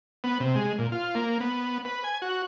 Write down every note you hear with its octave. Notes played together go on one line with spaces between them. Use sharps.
B3
C3
G#3
A#2
F4
A#3
B3
B4
G#5
F#4